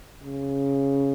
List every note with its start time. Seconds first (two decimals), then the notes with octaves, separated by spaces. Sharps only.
0.24 C#3